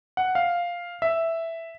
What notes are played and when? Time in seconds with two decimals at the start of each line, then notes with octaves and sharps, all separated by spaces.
0.17 F#5
0.35 F5
1.02 E5